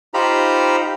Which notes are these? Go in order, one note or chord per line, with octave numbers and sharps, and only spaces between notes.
D#4 F4 G4 C5 A#5 B5